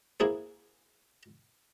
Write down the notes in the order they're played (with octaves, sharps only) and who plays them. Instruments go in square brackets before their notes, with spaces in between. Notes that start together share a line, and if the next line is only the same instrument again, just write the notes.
[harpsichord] A#3 E4 G#4 C5